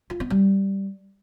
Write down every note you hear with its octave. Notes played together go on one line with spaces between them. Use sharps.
F4
B3
G3